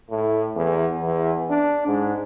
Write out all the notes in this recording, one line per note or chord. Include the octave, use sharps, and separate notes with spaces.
A2
E2
E2
D4
G#2